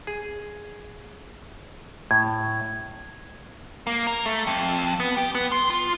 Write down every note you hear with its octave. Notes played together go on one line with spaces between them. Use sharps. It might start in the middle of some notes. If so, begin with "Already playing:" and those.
G#4
A2 G#6
A#3
A#4
A3
F2
B3
G4
B3
C6
F4